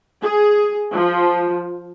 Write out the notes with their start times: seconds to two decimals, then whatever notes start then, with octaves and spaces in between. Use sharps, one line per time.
0.23 G#4
0.94 F3